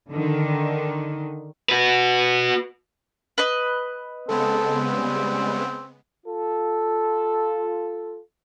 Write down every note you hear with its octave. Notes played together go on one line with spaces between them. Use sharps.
D3 D#3
F#4 B4
B4 D#5
C#3 G#3 B3 C4 A4
G3
F4 A4